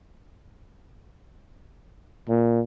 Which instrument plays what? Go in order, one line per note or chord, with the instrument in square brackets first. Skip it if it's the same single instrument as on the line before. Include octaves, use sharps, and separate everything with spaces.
[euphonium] A#2